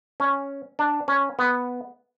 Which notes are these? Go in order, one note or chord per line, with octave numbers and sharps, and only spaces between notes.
C#4
D4
C#4
B3